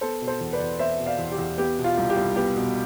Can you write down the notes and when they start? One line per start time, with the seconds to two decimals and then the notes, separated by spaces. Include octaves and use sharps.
0.01 B3 A4 C5
0.21 B2
0.27 A4 C5
0.40 E2
0.53 B4 D5
0.60 E2
0.79 B3 C5 E5
1.00 B2
1.06 D5 F5
1.19 E2
1.32 G4
1.38 E2
1.58 B3 G4
1.78 B2
1.84 F4
1.98 C2
2.10 G4
2.17 C2
2.36 B3 G4
2.56 B2